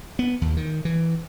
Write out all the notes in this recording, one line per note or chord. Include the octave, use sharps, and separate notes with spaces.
B3
D#2
D#3
E3